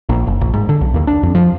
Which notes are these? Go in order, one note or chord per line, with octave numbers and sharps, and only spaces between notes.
A#1
F#1
A#1
G#2
D3
B1
D#2
D4
F2
F3